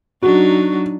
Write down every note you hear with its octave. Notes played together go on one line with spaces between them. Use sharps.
F#3 D4 D#4 F#4